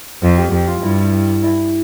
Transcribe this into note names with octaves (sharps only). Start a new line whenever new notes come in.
F2 F4 F5
G4 G5
F2 G4 G5
F4 F5
G2 E4 E5
E4 E5